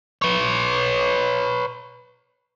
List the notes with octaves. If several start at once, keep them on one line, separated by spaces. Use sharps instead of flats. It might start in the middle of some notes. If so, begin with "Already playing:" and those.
B4 C#5